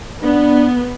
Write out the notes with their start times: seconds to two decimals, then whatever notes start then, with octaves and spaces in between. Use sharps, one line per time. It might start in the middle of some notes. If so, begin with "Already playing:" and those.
0.23 B3 D4